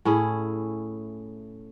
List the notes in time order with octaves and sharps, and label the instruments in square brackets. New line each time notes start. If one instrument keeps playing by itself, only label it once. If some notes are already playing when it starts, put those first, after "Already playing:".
[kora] A2 C#4 E4 G#4